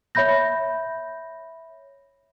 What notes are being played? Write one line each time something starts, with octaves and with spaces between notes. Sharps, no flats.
C#5 E5 B5 G6 A#6